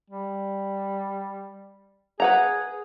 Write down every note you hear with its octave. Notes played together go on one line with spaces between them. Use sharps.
G3
G#4 B4 F#5 A#5